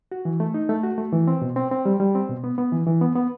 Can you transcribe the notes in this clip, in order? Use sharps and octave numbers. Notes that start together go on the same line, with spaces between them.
F#4
E3
A3
D#4
A3
F#4
A3
E3
C4
B2
C4
C4
G3
G3
C4
B2
B3
B3
E3
E3
B3
B3